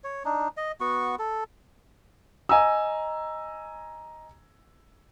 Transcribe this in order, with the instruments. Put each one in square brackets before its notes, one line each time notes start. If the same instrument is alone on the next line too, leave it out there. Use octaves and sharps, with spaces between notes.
[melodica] C#5
D4 D#4
D#5
B3 F#4 C#6
A4
[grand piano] D#5 G#5 A#5 E6